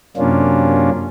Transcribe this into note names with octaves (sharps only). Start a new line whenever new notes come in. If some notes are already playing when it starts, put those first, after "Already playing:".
F#2 C3 A#3 C#4 D4 F4